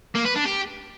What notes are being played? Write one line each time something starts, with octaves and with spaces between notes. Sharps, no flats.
A#3
B4
D4
G4